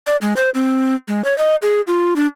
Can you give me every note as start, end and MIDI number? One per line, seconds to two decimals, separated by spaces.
0.07 0.16 74
0.22 0.33 56
0.36 0.50 72
0.54 0.95 60
1.08 1.24 56
1.24 1.36 73
1.38 1.55 75
1.62 1.81 68
1.87 2.14 65
2.16 2.26 62